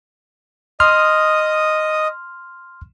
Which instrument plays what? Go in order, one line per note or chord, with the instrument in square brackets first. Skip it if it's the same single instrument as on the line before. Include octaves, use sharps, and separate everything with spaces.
[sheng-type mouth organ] D#5 D#6 [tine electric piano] C6 F6